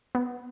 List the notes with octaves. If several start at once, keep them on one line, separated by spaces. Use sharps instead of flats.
B3